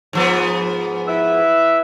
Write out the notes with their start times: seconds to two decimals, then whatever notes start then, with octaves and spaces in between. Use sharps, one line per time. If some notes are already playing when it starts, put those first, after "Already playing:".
0.13 G#2 F3 B3
1.08 E4 B4 E5